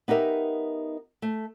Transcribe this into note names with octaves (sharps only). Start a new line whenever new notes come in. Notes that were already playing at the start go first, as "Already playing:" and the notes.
B3 D#4 G4 A#4 E5
A3